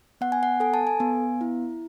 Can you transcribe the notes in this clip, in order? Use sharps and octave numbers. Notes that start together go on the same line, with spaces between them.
B3 F#5
G#5
F#5
A4 G#5
A5
G#5
B3
E4